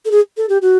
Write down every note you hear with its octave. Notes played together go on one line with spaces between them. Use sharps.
A4
G#4
A4
G4
F#4